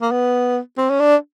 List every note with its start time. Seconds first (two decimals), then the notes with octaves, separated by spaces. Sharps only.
0.02 A#3
0.11 B3
0.78 C4
0.90 C#4
1.00 D4